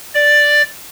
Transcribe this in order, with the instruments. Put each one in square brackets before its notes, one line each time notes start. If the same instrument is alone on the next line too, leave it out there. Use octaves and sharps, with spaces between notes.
[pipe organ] D5